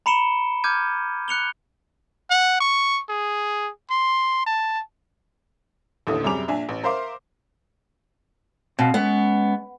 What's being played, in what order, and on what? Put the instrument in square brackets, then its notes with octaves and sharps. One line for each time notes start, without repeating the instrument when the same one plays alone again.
[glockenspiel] A#5 B5 C#7 D7 E7 G7
D6 F6 G6 G#6 D#7
F#6 C#7 F7 G7
[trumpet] F#5
C#6
G#4
C6
A5
[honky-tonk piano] A1 D#2 A2 D3 A4 D#6
F#2 C3 G3 G#4 D6 F7
A#1 D4 E5 G#5
A1
A#4 C5 E5 F5 C6 D6
[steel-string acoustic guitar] B2 [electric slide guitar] C4 F5
[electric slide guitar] G#3 C#4 [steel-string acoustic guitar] B3